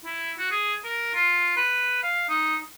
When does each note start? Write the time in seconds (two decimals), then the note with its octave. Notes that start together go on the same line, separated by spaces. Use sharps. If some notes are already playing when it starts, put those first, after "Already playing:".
0.05 E4
0.39 F#4
0.51 G#4
0.85 A#4
1.15 F4
1.57 B4
2.03 F5
2.29 D#4